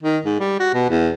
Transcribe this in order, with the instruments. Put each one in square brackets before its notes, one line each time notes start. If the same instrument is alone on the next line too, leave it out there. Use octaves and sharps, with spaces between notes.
[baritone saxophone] D#3
G#2
G3
F#4
B2
E2